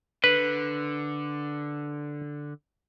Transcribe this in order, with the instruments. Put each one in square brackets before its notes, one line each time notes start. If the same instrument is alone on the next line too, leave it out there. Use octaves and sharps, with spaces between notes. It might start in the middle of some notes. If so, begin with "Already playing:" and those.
[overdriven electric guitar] D3 [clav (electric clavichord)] B4